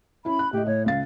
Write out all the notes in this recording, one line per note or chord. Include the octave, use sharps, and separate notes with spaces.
C#4 E4 E5 B5
F#6
A2 G4 D#5
A2 C#5
C#2 F5 A6